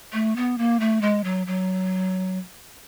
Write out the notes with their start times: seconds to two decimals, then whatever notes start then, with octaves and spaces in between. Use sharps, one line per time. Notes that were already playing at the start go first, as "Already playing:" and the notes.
0.13 A3
0.36 B3
0.58 A#3
0.80 A3
1.01 G#3
1.24 F#3
1.47 F#3